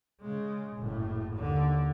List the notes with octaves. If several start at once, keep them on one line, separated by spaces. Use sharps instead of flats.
C#3 G#3
F#1 A2
D#2 D3